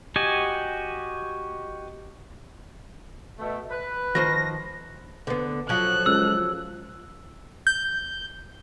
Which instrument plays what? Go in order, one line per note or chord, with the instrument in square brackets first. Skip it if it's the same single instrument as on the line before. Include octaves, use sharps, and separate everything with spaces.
[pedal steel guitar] F#4 G4 D#5 G#5
[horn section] B2 A3
B4
[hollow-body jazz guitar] D#3 F3 C5 [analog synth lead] A#6
[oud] D3 B3
[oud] F3 F#3 [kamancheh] A4 F#6
[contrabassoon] C#2 [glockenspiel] E6
[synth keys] G6